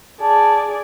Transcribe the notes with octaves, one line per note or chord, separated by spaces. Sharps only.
G#4 D5 A5